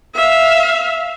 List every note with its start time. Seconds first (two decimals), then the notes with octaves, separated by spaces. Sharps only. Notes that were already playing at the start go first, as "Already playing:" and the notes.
0.15 E5 F5